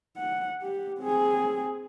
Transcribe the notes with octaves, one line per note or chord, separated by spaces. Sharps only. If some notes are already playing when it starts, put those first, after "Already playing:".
F#5
G4
C4 G#4